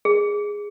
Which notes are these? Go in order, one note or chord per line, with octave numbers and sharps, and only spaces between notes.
G#4